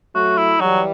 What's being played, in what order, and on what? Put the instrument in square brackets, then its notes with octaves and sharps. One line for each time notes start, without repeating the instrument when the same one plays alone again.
[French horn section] F#3 A3 [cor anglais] F#4
[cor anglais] E4
[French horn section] E3 G3 [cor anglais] F#3